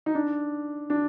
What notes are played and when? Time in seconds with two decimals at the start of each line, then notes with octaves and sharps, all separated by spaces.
0.06 D#4
0.15 D4
0.90 D4